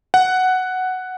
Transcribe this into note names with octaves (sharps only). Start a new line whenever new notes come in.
F#5